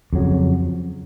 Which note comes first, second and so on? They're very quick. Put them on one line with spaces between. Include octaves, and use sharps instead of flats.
F2 F#3 C#3